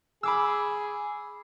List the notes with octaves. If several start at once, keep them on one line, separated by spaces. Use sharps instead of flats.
G#4 B5 D6 E6